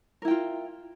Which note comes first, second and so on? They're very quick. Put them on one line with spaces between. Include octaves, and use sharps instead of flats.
A#4 E4 G5 F4